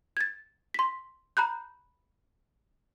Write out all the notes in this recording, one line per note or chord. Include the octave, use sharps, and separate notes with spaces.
G#6 A6
C6 B6
A#5 B5 F#6 G6